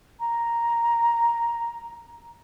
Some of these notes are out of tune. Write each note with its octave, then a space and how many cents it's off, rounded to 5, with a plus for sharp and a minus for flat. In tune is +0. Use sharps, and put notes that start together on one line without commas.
A#5 +0